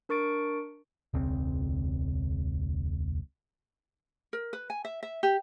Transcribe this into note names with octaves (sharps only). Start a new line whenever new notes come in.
D4 A#4 C#6 A6 D7
E1 C#2 C4
A#4
B4
G#5
E5
E5
G4